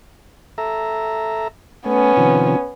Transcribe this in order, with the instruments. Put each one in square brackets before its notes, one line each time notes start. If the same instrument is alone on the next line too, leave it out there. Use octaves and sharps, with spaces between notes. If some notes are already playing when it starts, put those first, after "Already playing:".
[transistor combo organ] A4 E5 A#5
[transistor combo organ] A3 [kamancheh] B3 C#4
[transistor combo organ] C3 D#3 F3